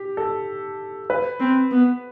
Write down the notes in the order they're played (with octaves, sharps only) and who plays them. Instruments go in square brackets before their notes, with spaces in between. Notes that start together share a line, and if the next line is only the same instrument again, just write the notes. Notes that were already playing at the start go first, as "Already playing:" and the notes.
Already playing: [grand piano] G4
A4
B4
[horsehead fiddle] C4
B3